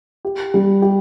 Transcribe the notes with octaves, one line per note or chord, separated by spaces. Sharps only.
G4
G3
G4